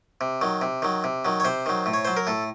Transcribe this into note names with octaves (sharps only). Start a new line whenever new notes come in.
C3
D#3 F#3
C3
D#3 F#3
C3
D#3 F#3
C#5
C3 C5
D#3 F#3
A2
C#5
F#3 C5
A#4
A2 A4